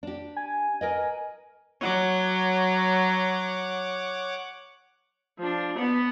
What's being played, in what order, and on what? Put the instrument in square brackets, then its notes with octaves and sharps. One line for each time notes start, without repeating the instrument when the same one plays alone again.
[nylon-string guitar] D4 G4
[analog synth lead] G#5
[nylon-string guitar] A#4 B4 D#5
[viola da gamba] F#3 [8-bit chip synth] C#5 F#5 D6
[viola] F3 D4
B3 F#5